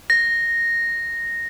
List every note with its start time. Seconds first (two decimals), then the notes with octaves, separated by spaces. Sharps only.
0.10 A#6